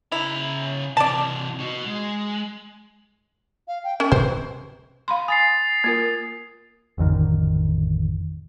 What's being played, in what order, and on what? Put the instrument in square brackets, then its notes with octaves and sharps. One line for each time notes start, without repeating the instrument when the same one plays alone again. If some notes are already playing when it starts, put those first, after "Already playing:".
[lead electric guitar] C#3 A#5 [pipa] E4
[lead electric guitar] C3 E3 [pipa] D5 A5
[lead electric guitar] F#4 D#5
G#3
[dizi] F5
G5
[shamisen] C#4 [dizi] A#4
[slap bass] B2 C#4 [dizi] B4 [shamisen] C5
[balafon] F5 B5 C6
[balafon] G#5 [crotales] D#6 A6 C7
[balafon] A#3 F4 A#4
[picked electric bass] A1 F2 D3 D#3